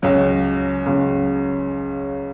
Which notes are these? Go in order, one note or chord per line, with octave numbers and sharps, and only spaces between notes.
C#2 C#3 F#3
C#2 C#3 F#3